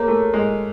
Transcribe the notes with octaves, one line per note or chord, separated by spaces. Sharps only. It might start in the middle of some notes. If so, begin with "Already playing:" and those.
Already playing: A#3 G#4 C#5 A#5
A3
G#3